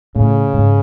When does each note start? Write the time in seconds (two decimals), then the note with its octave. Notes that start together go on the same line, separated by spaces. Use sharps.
0.16 A2 C#3
0.54 G#2